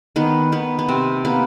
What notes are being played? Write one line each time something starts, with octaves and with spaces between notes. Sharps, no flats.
D#3 B3
D#3 B3
B3
C3 C4
A#3 B3